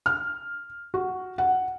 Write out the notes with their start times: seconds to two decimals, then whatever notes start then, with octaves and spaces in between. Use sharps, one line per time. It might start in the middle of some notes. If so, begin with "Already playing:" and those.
0.06 F6
0.94 F#4
1.38 F#5